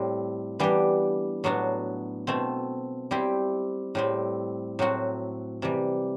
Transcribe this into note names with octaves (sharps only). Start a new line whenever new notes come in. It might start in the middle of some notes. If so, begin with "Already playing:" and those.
Already playing: A2 G3 C4
E3 G3 B3 D4 G4
A2 F#3 B3 D4 F#4
B2 A3 C4
G3 C4 E4 G4
A2 G3 C4
A2 F#3 C4 F#4
C3 E3 G3